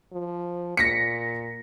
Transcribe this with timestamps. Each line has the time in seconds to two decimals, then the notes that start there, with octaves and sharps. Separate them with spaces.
0.12 F3
0.77 A#2 A#6 B6 C#7